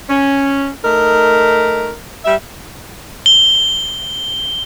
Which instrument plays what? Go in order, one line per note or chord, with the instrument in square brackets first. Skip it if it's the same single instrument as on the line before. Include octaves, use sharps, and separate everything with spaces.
[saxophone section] C#4
A3 D#4 A#4
G3 E5
[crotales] G7